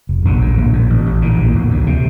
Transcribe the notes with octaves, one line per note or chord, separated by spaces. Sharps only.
F1
A#1 D3
A2
A#1
A2
A1
A1
A#2 D3
A#1
A#1
D2
C3